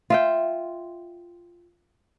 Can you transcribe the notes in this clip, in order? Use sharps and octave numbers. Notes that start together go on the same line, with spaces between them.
F4 E5 G5